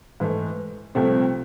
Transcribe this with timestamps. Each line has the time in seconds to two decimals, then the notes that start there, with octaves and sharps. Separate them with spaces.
0.20 G#2 E3 A3
0.95 C2 C3 F3 A3 C4